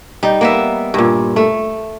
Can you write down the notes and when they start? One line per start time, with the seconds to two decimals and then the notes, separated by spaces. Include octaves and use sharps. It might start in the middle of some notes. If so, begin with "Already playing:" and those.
0.23 G3 D#4
0.41 A#3 B3 E5
0.94 G2 A#2
1.36 A3